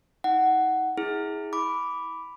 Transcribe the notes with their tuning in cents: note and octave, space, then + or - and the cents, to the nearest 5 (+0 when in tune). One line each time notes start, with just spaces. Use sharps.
D#4 +40 F#5 +10
E4 -30 G#4 +0
B5 +0 D6 -10